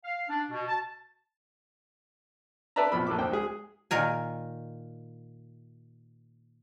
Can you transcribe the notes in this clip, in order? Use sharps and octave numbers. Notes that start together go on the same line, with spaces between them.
F5
D4
B2
A5
A4 B4 D5 E5 A5 A#5
A#1 B2 F3 B5
A#1 A#3 A4 D6
D2 C5 G5
G#3 G#4
A#2 D#3 A#4 G#5